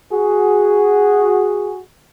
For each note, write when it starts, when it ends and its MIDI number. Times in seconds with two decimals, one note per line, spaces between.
0.11 1.80 66
0.11 1.80 68